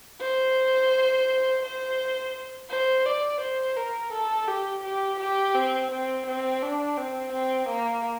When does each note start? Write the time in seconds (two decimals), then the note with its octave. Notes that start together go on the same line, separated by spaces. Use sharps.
0.21 C5
1.63 C5
2.70 C5
3.06 D5
3.41 C5
3.77 A#4
4.12 A4
4.48 G4
4.84 G4
5.20 G4
5.55 C4
5.91 C4
6.27 C4
6.62 D4
6.97 C4
7.33 C4
7.69 A#3